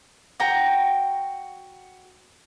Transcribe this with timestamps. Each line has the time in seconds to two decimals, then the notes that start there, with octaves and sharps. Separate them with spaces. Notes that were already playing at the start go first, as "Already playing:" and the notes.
0.40 F#4 G5 A#5